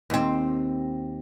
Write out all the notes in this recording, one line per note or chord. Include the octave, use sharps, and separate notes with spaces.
D#2 C4